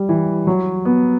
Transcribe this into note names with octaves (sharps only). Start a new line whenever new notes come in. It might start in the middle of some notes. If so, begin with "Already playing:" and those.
Already playing: G3
E3
F#3
B3